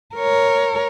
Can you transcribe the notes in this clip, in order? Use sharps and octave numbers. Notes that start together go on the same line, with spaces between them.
A#4 C#5